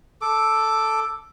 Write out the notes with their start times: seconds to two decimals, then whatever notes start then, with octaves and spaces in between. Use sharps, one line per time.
0.21 A4 D6